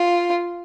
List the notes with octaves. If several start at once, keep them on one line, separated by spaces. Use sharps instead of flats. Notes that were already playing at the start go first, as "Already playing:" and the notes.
Already playing: F4